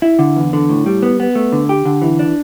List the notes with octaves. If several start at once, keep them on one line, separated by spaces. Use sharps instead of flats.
E4
D3
E2
D3
A2
G3
B3
B3
A3
D3
G4
D3
E3
D4